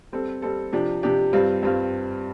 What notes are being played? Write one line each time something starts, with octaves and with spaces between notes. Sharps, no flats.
G3 C4 A4
G3 C4 A4
C3 F3 D4 G4
C3 F3 D4 G4
G2 G3 C4 F4
G2 G3 C4 F4